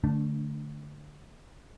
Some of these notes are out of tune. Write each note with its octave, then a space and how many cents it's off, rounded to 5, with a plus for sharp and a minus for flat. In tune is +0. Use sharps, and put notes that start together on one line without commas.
D3 +0 A3 +0 D4 -30